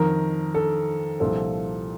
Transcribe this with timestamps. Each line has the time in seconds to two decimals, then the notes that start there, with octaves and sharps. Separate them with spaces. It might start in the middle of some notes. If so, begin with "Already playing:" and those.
Already playing: F2 D#3 A#4
0.54 A4
1.20 C2 A#2 F3 A4